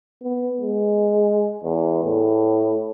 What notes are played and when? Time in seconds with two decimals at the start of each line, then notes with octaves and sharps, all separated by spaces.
0.23 B3
0.61 G#3
1.64 E2
2.04 A2